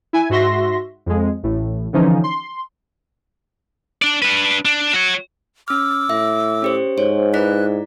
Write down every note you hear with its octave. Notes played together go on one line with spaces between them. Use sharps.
E4 G#5
G#2 F#4 E5 C6 A#6
F2 G#3
A1 A2
D3 E3 F3 C#4 D#4
C6
D4 D5
D4 B4
D4
F#4 C#5
C#4 D6 E6 F6
A2 E5
C#4 G4 C5
G#2 C5 C#5
E4 B4 D5 F#6 B6